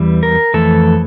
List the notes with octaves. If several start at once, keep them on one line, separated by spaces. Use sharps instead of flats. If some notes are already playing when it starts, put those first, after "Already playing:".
Already playing: E2 E3 G3
A#4
F2 E3 A3 A4